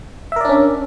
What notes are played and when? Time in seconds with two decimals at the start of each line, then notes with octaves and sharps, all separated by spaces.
0.32 E5
0.36 A#4
0.41 D5
0.45 D4
0.49 C#4